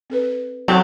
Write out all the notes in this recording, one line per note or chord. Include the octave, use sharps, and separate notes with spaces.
C4 A4 B4
F#3 C4 C#4 F#4 G4 A4